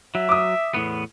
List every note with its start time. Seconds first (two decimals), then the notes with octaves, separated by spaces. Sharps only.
0.15 F#3 E5
0.29 D6 D#6
0.74 E2 A2 B3